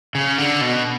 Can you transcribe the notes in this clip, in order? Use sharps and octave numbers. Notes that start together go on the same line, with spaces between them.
C#3
D3
B2